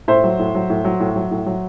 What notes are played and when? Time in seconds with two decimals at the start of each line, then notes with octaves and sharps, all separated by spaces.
0.08 A2 C5 E5
0.24 F#3
0.39 A2
0.55 F#3
0.70 A2
0.85 F#3
1.00 A2
1.16 F#3
1.31 A2
1.46 F#3